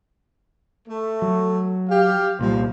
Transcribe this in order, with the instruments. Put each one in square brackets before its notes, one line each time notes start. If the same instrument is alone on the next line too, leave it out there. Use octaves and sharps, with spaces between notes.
[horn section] A3
[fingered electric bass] F#3
[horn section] G4 F5
[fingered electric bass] C2 A#2 G3 [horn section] F3 C5